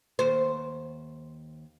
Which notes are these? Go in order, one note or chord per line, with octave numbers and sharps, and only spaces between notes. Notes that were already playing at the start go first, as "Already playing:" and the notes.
D#2 C5